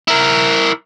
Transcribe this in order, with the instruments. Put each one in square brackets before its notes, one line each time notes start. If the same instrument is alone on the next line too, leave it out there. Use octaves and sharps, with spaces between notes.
[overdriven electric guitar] E4 A#4